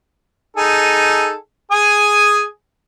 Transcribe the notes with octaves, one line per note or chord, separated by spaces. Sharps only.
D#4 G#4 A4
G#4 G#5 D#6